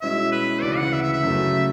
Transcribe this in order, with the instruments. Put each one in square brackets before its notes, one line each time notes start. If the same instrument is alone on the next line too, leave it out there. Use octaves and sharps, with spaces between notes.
[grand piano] B2 G#3 C#4 E4 [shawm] E5
[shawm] B4
[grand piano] D2 C#3 E3 [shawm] D5
[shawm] F#5
E5
E5
E5
[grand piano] F#2 C#3 F#3 A3